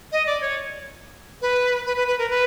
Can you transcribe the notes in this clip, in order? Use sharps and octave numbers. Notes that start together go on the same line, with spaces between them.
D#5
D5
C#5
B4
B4
B4
B4
A#4
B4